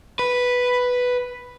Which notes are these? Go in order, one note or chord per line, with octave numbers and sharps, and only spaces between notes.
B4